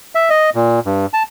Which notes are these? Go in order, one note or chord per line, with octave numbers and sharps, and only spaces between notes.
E5
D#5
A#2
G2
A5